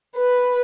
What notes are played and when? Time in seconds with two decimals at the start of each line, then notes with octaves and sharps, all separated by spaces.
0.18 B4